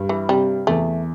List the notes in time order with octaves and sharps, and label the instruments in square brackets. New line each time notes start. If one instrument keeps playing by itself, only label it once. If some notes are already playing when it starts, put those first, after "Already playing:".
Already playing: [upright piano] G2
[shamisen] E3
[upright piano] C3 [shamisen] G3
[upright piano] E2 [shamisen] A3